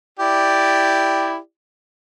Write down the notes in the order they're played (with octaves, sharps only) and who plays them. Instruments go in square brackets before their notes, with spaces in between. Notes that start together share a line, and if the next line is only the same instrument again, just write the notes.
[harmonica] E4 G4 D5